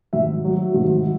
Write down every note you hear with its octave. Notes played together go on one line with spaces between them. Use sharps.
G#1 E5
F#3
G#1